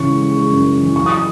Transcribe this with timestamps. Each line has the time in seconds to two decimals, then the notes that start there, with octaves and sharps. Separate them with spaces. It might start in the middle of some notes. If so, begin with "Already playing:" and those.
Already playing: C#3 E3 C#6
0.08 G#3
0.22 G#3
0.37 G#3
0.52 F#2
0.66 G#3
0.81 E3
0.96 F#3 C#6
1.06 D#6